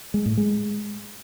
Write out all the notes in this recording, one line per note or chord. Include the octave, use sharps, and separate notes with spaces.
G#3
A2
G#3